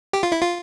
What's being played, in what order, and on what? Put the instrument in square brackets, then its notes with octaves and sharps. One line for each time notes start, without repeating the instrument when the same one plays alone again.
[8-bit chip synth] G4
F4
E4
F4